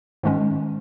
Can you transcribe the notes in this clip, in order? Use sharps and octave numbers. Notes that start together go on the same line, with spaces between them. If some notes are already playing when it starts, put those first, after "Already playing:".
G#2 D#3 G#3 C#4